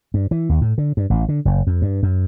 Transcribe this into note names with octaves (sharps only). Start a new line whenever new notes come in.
G2
E3
D#2
A2
D3
G2
A1
D3
F#1
F2
G2
F#2